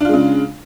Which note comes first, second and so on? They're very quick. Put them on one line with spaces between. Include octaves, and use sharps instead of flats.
D4 F4 G#3 C#3